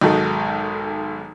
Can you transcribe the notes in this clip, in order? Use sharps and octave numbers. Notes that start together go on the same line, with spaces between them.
B1 G#2 D#3 F#4 A4